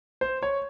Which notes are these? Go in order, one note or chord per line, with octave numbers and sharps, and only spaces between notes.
C5
C#5